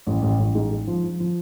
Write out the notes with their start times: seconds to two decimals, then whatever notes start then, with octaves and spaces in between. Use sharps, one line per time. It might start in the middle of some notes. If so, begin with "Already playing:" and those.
0.07 A1
0.22 A1
0.39 A1
0.55 G#2
0.71 G#2
0.87 F3
1.03 F3
1.20 F3